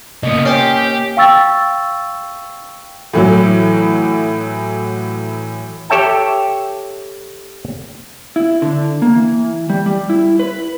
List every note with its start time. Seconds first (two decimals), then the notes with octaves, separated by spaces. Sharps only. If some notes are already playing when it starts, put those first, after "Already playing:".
0.23 C#3 A#3 B3 D#5
0.45 C#4 G4 C5
1.17 F5 G5 C#6 E6 A6
3.13 A2 E3 F#3
5.90 G4 A4 C#5 E5 G5 A5
8.36 E4
8.62 D3
9.02 A#3
9.16 E3
9.70 G3
9.86 G3
10.10 E4
10.40 B4